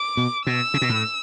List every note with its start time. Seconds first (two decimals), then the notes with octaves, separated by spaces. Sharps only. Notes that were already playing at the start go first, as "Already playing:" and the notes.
Already playing: D6
0.17 B2
0.47 B2 E6
0.74 C#3
0.82 B2
0.89 A2